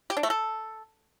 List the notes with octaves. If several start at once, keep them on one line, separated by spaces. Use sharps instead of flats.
G4
D4
A3
A4